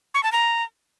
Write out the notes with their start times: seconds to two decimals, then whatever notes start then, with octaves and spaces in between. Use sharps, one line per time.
0.14 C#6
0.23 A5
0.32 A#5